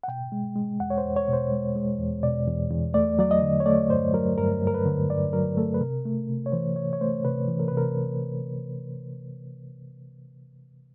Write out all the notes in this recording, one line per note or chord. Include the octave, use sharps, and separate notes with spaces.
F#5
B2 G5
G#3
G#3
E2 F#5
C#5
C5
E2
C#5
B2 C5
G#3
G#3
E2
B2 D5
E2
E2
A3 D5
F#3 D5
D#5
D3
C#5
A3 D5
G2 C5
F#3 A#4
G2 A#4
G2
A#4
B4
D3
G2 D5
F#3 A#4
A3 A4
B4
C3 A#4
A3
C3
C#5
E3 C5
C3 C#5
C#5
A3 C5
C3 B4
E3
A#4
B4
C3
A#4